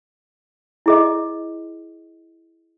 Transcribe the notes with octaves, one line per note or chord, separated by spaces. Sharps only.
E4 G#4 D#5